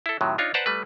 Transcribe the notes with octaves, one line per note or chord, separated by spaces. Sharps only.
E4 A4
A2 C3 D#3 F#3
D4 D#4 F4 C#5
B4 C5 D5 F#5 A5 A#5
G3 A3 B4